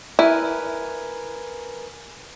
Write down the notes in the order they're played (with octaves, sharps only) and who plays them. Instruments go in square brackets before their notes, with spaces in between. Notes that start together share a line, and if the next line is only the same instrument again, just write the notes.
[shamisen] E4 [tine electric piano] A#4 B4 G#5